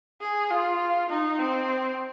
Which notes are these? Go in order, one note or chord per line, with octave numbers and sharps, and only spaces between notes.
G#4
F4
D#4
C4